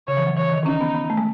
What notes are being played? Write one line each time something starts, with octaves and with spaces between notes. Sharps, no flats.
C#3 C#5
E3
F#3
E3 C#5
D#3
C#4 D#4
B3
B3
A3
G#3